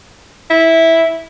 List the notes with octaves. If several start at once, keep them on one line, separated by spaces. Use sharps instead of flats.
E4